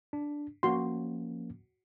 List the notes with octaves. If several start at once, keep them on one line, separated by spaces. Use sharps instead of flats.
D4
F3 A#3 C#4 F#4 C6